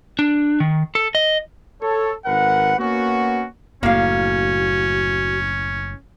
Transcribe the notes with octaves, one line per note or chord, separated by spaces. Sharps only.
D4
D#3
A4
D#5
A4 C#5
G#1 A#4 B4 F#5
A#3 B3 C#4 F#4
F#1 A2 A#3 C#4 F#4 F5